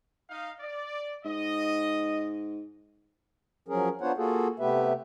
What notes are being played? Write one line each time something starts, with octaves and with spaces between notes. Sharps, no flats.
D#4 F5
D5
G#2 D#5
F3 F#3 C#4 G#4 A#4
B3 D4 F4 C5 C#5 F#5
A#3 F4 F#4 G#4 A4
C3 A3 B3 G4 B4 E5